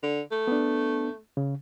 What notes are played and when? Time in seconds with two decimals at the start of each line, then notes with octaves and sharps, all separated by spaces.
0.03 D3
0.31 A3
0.47 B3 D4
1.37 C#3